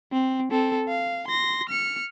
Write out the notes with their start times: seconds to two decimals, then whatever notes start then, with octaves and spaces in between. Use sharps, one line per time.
0.12 C4
0.51 C4 A4
0.89 F5
1.28 C6 A#6
1.69 F6 C#7